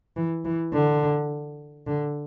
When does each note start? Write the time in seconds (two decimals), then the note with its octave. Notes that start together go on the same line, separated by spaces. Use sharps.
0.16 E3
0.45 E3
0.74 D3
1.87 D3